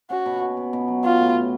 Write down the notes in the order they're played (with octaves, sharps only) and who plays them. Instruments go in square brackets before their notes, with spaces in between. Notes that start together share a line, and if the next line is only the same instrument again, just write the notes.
[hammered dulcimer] C#4 [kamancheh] F#4
[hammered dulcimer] B2
B2
B2
B2
F#3
[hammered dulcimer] B3 [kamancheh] F4
[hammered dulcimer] A2
A2